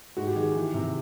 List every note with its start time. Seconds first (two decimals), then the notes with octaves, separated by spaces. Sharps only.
0.17 G#2 F#4
0.27 G4
0.36 D#3 G#4
0.45 G4
0.55 E3
0.74 C3